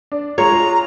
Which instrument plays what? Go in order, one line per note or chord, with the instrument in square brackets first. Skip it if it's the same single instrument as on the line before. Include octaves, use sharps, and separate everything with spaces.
[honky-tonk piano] D4
[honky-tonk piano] G#3 F4 [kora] C#5 [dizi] A#5